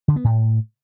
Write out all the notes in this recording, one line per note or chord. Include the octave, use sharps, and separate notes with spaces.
D3
B3
A2